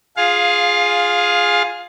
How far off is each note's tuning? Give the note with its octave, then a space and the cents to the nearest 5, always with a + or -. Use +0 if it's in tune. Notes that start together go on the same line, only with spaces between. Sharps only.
F4 +0 G#4 +0 F5 +15